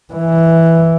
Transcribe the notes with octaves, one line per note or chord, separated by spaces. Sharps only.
E3